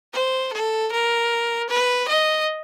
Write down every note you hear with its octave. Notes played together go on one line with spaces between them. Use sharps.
C5
A4
A#4
B4
D#5